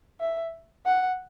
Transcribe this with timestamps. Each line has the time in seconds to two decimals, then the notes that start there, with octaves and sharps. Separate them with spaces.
0.21 E5
0.86 F#5